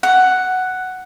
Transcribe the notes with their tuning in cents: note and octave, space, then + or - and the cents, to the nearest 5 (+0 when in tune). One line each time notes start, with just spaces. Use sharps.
F#5 +5